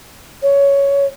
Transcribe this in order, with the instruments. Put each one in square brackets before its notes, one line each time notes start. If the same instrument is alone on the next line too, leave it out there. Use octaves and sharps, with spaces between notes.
[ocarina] C#5